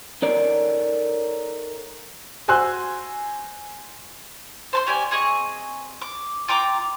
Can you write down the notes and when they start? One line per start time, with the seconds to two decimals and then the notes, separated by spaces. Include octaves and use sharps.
0.22 D#4 A4 A#4 C#5 D5
2.48 F#4 C5 G#5 C6 E6 F#6
4.73 C5 A5 C6
4.87 C#4 G4 D5 G#5
5.11 C4 G#4 D#5 C#6
6.02 D6
6.48 F4 G5 A#5 D6